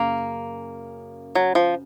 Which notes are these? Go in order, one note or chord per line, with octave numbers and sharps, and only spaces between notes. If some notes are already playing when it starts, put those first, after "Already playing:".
Already playing: F#2 C#3 A#3
F#3
F3